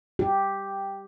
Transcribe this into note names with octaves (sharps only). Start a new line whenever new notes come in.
G4